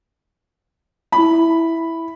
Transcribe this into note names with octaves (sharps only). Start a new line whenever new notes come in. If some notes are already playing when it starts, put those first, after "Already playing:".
E4 B5